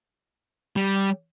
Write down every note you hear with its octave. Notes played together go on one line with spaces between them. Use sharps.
G3